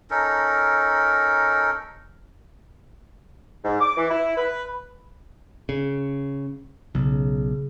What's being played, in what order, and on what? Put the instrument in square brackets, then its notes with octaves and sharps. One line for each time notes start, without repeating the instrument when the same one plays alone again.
[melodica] C#4 D#4 A4 A#4
[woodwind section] G#2
D6
E3
E4
B4
[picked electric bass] C#3
[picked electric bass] B1 [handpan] C#3